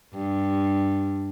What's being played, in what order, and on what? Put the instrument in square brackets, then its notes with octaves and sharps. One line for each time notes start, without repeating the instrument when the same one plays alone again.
[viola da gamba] G2